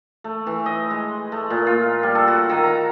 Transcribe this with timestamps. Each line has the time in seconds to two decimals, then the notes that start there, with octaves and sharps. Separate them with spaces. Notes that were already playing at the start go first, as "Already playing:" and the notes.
0.24 A3
0.47 E3
0.66 D#5
0.91 G#3
1.32 A3
1.50 A#2
1.67 F4
2.03 G3
2.15 A4
2.28 F#4
2.49 D#3
2.63 A#5